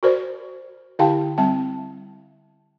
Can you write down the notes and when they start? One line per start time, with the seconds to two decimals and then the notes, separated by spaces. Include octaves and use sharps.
0.03 F#4 A#4 C5 D5
0.99 D3 E4 G4 F5 G5 A5
1.38 G3 C4 A5